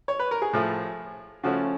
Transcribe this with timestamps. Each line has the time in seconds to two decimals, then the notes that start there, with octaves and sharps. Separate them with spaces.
0.08 C#5
0.19 B4
0.31 A#4
0.42 G#4
0.53 A2 F3 A3
1.44 C#3 F3 A3 C#4 F#4